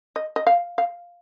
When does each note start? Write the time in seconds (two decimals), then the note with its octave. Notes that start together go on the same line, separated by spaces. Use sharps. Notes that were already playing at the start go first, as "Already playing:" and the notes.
0.16 D#5
0.36 D#5
0.47 F5
0.78 F5